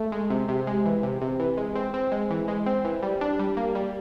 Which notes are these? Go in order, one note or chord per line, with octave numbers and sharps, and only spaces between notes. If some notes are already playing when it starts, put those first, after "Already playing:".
Already playing: A3
G#3
C3
C3
G#3
E3
C3
C3
E3
G#3
C4
C4
G#3
E3
G#3
C4
E3
G3
D4
G3
A#3
G3